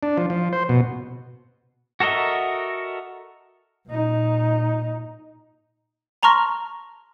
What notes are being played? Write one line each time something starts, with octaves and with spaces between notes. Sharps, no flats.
D4
F3
F3
C5
B2
F#4 A4 A#4 D#5 E5
A#2 D#4
A5 A#5 C6 C#6 F6 A#6